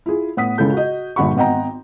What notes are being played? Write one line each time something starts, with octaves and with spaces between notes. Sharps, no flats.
E4 F4 G#4
A2 B3 F#5 D#6 B6
C#2 C#3 G#3 E4 A4 G6
F#4 D#5
A#1 G2 D3 F#5 B5 C#6
G#1 B3 D#5 F#5 G5 A#5